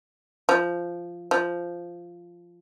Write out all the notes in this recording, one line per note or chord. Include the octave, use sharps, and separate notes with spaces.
F3
F3